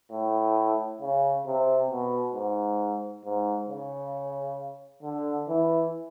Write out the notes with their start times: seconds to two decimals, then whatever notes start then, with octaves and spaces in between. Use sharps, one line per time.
0.11 A2
1.02 C#3
1.46 C3
1.90 B2
2.34 G#2
3.25 G#2
3.69 C#3
5.02 D3
5.48 E3